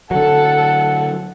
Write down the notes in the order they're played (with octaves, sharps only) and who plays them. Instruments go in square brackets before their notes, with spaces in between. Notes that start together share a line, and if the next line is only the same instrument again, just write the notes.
[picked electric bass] D3 F#3 [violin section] A4 [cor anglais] F#5